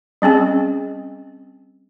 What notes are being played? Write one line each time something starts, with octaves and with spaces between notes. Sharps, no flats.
G3 C4 C#4 G#4